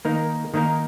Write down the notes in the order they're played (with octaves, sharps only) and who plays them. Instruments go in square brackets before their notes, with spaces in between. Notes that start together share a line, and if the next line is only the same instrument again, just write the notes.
[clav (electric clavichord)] D#3 A#3 D#4 A#4
D#3 A#3 D#4 A#4